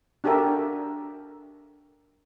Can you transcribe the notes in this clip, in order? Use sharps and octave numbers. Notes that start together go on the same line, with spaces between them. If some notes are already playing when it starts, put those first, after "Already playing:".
D4 F#4 G4 A4 A#4 E5